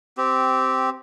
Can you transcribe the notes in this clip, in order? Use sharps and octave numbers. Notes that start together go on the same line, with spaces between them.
C4 G4